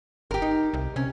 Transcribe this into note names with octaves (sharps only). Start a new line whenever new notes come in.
G1 G4 A#4
D#4
C2
C3 C#4